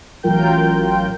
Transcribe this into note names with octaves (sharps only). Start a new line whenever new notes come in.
A1 F#3 F4 A#4 G5 G6